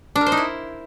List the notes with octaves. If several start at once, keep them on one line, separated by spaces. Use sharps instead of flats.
D4
A#4
C5
D#4
E4